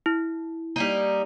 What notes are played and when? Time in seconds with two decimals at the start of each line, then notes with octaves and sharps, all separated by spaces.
0.06 E4
0.76 G3 A#3 D#4